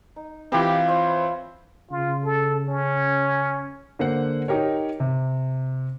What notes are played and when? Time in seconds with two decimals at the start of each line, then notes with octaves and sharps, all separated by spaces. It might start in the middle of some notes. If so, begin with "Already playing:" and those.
0.16 D#4
0.52 E3 C4 F4 G4 C5 B5
0.88 C5 C#5 E5
1.91 C#3 F4
2.25 A4
2.68 C#4
3.99 D3 A#3 C5 F#5
4.48 D#4 G4 A#4 C#5
5.00 C3